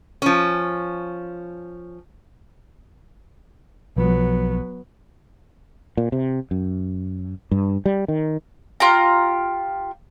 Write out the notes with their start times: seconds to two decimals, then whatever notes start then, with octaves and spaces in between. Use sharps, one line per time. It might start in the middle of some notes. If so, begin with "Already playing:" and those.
0.22 F3 C#4
3.96 B1 F3 F#3 B3
5.97 A#2
6.12 C3
6.51 F#2
7.51 G2
7.86 G3
8.08 D#3
8.80 F4 G4 A#5